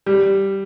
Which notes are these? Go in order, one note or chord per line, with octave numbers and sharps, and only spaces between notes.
G3